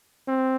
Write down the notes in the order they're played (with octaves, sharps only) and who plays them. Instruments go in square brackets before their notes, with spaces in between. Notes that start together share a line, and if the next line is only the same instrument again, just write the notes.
[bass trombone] C4